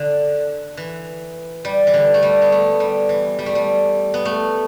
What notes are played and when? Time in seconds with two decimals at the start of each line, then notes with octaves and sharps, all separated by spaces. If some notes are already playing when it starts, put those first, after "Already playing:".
Already playing: D3
0.77 E3
1.65 G3
1.87 E3
1.94 D3
2.14 A3
2.22 G3
2.41 B3
2.52 A3
2.80 G3
3.09 E3
3.39 G3
3.46 A3
3.55 G3
4.14 B3
4.25 A3